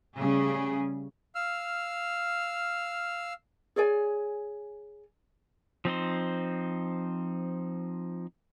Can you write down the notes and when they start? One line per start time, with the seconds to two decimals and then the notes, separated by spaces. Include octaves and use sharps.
0.18 C#3 G3 A3 G#4
1.35 F5 E6 F6
3.76 G#4 C#5 D5 G#5
5.85 F3 C4 D#4 C5